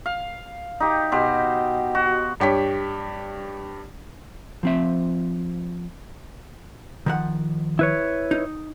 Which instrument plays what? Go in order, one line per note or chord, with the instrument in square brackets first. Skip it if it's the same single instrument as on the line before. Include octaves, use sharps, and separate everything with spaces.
[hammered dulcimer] F5
D#4 G4
B2 G4 C5
F#4
[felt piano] G2 G4 C#5 B6
[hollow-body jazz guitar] F3 C4 E5
D#3 F3 F#5
[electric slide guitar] E4 B4 C#5
[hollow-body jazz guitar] D#4